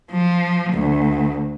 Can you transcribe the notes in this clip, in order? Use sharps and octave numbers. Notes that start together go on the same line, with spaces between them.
F3
D2